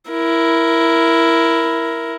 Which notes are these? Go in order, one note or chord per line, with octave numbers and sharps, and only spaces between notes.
E4 A#4